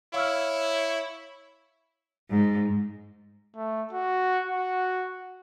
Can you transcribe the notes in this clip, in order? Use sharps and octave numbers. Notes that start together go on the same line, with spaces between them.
E4 C#5 F5 E6 F6
G#2
A3
F#4
F#4